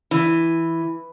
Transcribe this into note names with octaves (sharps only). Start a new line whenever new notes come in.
E3